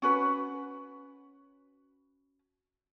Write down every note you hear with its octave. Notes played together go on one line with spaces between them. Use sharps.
C#4 F#4 B4